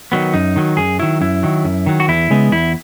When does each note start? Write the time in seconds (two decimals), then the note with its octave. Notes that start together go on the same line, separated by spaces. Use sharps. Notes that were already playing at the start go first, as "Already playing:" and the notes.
0.12 D#3 F#3 B3
0.34 F#2 D#4
0.56 D#3 F#3
0.77 F#2 G#4
0.99 D#3 F#3 E4
1.21 F#2 E4
1.43 D#3 F#3
1.64 F#2
1.86 D#3 F#3
2.00 F#4
2.08 E2 E4
2.30 C#3 G#3 B3
2.52 E2 E4